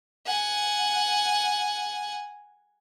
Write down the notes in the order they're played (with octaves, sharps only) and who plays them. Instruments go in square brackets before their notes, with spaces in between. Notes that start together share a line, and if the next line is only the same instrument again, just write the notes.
[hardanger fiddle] F#5 G#5